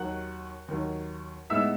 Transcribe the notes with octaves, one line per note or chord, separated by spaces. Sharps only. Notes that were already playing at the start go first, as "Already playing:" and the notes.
Already playing: D#2 D#3 F#3 F#5 F#6
D#2 D#3 F#3
A2 G#3 B3 D#4 E5 E6